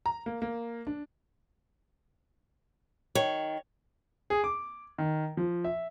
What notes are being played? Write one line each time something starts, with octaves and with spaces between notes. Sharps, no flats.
A#5
A#3
A#3
D4
D#3 C#5
G#4
D6
D#3
F3
E5